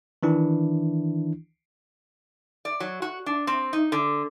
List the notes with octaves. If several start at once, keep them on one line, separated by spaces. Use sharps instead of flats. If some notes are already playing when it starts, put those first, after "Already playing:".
D#3 E3 D4 E4
D5
F#3
F#4
D4
C4
D#4
D3